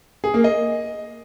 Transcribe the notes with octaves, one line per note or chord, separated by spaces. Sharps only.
G#4
A#3
D#5